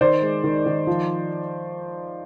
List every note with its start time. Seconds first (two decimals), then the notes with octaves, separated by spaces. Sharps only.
0.01 D#3 C5 D5
0.22 G#3
0.44 D#3
0.66 D#3
0.87 F3